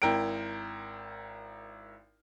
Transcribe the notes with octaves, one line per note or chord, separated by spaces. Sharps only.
G#1 E4 A#4 G5 D7